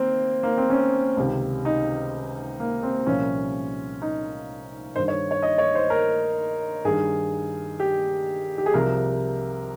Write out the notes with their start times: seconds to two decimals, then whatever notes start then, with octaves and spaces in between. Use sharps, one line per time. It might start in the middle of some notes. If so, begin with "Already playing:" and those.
Already playing: D#3 A#3 C4
0.43 A#3
0.57 C4
0.70 C#4
1.17 C#2 C3 D#3
1.65 D#4
2.60 A#3
2.83 C4
3.06 C2 A#2 F3 C#4
4.02 D#4
4.96 G2 D#3 C5
5.08 C#5
5.31 C#5
5.42 D#5
5.58 C#5
5.75 C5
5.90 A#4
6.85 G2 D#3 G#4
7.80 G4
8.58 G4
8.66 G#4
8.74 C2 C3 F3 A#4